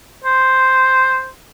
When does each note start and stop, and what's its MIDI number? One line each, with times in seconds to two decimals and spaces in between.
0.24 1.29 72